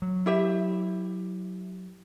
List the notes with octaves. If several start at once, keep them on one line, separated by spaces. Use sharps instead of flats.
F#3
E4 G4 E5